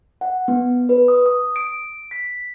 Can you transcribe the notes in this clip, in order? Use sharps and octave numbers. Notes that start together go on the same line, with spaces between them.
F#5
B3
B4
D#6
D#6
D7
B6